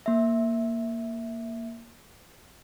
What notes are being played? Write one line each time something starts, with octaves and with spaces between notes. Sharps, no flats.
A#3 E5